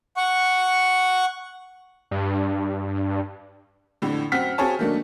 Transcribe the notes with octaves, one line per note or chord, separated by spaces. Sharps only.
F#5 C#6
G2
F2 A2 D3
F#2 C4 F#5 F6 B6
C4 F#4 G#4 C#5 A5
D#3 F#3 A3 A#3 D4